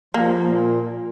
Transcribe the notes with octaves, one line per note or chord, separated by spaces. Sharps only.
F3 A#3
A#2